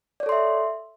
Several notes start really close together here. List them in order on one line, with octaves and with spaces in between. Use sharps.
D5 C#5 A4 C6 E5